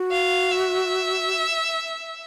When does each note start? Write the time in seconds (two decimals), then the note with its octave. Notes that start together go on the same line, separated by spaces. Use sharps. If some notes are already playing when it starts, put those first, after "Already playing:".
Already playing: F#4
0.11 F5
0.52 E5